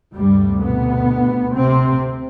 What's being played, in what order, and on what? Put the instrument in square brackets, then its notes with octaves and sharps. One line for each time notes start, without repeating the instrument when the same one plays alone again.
[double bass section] D2 G2 C3 G3
B2 B3
C3 C4